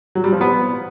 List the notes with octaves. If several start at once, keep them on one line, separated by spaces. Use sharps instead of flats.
F#3
G3
F3
B3